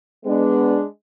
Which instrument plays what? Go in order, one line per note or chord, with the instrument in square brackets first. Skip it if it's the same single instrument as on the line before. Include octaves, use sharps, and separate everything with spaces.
[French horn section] G#3 B3 D4